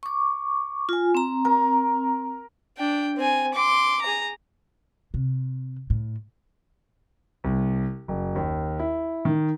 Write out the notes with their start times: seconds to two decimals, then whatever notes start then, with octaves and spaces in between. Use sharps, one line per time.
0.03 C#6 D6
0.89 F4 G#5
1.15 C4 A#5
1.45 A#4
2.78 D4 G5
3.17 C4 G#5
3.54 C6 D6
4.02 G#4 A#5
5.14 C3
5.90 A2
7.44 C2
8.08 F#1
8.36 D#2
8.80 E4
9.25 D#3